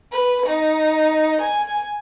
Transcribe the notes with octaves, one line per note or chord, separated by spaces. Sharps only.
B4
D#4
G#5